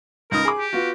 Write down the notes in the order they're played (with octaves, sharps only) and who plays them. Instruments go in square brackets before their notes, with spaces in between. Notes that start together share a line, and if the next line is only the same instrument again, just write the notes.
[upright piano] C#2 D#4 D#6 [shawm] A#4
[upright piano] G#4 D6
[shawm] G4
[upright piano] B3 F4 F#4